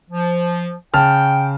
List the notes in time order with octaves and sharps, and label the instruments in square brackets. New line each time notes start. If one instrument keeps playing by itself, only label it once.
[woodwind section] F3
[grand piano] C#3 A5 F6 [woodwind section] G5